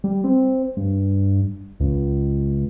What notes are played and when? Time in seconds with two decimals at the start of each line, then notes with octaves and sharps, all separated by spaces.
0.04 G3
0.24 C4
0.77 G2
1.80 C#2